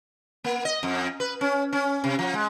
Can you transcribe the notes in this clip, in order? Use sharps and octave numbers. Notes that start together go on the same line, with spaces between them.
A#3
D#5
F2
B4
C#4
C#4
C3
F3
G#3